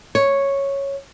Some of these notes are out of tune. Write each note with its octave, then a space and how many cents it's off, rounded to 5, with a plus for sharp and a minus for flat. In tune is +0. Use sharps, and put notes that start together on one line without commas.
C#5 -5